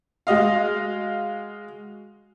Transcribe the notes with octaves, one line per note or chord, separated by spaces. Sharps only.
G#3 F#4 D#5 F5